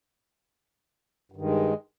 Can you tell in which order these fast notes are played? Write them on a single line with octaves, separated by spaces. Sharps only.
G2 D#3 G#3